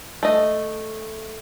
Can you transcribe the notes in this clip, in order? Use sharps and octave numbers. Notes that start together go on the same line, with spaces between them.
A3 D#5